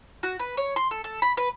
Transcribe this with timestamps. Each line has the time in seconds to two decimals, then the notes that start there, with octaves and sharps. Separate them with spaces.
0.23 F#4
0.39 B4
0.57 C#5
0.76 C6
0.91 A4
1.04 A4
1.22 B5
1.37 B4